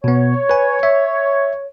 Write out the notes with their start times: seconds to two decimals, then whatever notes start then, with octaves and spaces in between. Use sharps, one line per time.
0.04 B2 B3 C#5
0.50 B4 G#5
0.83 E5